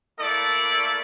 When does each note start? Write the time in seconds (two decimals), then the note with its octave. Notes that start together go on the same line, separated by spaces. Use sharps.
0.19 A3 A#3 E4 A4 D5